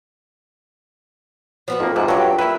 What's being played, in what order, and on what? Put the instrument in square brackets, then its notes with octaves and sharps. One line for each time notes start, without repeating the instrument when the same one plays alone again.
[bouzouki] F3 B3 F#4
[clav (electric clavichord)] F2 A#3 [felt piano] F4
[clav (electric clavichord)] G#2 C3 [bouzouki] F#4
[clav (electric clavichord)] G2 F#3 [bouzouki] G4 A4
[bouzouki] A#3 E5 [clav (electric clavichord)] E4 B4